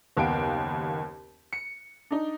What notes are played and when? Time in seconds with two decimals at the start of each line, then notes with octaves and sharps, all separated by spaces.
0.17 F#1 D#2 B3 F5 G5 D7
1.53 C#7
2.11 D4 D#4